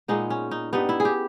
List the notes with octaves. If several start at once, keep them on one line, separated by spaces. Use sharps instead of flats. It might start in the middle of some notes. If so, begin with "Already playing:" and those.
A#2 G#3 B3 D#4
C#4
D#4
G2 G3 B3 D#4
E4
G#4
G4